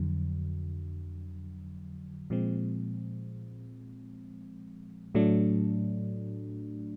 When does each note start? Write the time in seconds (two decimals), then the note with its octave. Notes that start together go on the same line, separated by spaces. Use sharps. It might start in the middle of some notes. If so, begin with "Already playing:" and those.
Already playing: F2 D3 F#3
2.30 A#2 F3 G#3 C4
5.15 A2 F#3 A3 D4